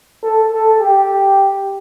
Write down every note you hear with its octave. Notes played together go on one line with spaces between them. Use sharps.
A4
A4
G4